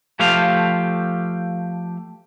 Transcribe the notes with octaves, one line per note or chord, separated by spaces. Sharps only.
F3 A3 G4 C5 F5